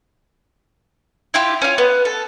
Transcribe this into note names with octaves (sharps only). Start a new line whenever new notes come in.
E4 F4 G4
C#4 F4
B3
A4